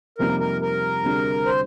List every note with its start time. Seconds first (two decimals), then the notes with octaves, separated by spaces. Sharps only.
0.18 F2 C3 G3 A#3 D#4 A#4
0.40 A#4
0.61 A#4
1.03 D2 C3 G3 D4 G#4
1.46 C5